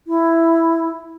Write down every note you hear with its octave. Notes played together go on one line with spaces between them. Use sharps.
E4